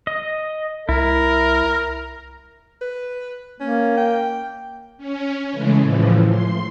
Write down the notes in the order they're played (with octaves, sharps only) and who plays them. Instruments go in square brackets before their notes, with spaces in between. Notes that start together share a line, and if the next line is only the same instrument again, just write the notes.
[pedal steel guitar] D#5
[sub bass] C2 [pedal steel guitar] E4 [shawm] A#4
[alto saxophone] B4
[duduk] A#3 [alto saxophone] C#4
[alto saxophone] G5
[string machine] C#4
C#3 E3 G#3 A3
A2 E3 F3
C6